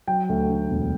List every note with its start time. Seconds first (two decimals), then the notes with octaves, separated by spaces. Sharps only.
0.08 F#3 G5
0.29 D2
0.49 D3
0.70 E1